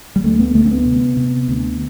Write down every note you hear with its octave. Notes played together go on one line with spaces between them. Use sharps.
G3
D2 A3
B3
D2 A3
C4
B3
C3
C3
D2